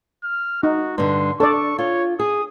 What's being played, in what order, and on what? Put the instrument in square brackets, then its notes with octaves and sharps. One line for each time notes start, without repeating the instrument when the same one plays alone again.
[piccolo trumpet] F6
[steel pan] D#4 [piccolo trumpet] F#4
[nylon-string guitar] G2 D3 [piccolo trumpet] C6
[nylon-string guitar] D4 [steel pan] A4 D5 [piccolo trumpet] C#6
[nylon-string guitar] F4 [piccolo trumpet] C#5
[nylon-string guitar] G#4 [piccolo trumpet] D#6